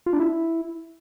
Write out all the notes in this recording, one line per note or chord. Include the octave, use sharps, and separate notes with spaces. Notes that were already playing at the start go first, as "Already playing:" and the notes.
F4
D4
E4